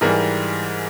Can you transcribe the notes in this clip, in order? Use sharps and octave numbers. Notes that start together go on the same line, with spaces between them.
G#2 E3 G3 G#4 A#4